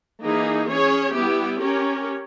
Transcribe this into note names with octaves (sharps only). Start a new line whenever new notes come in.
E3 A#3 D#4 G#4
C#4 G#4 C#5
G3 B3 E4 G4
C#4 G4 A#4 C#5